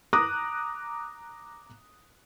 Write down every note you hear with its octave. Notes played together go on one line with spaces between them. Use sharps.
A#5 D6 D#6 F#6 A#6